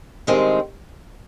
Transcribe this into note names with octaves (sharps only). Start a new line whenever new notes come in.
G2 D#3 G#3 C4